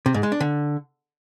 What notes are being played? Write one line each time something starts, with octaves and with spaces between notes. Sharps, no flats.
C3
G#2
G#3
D4
D3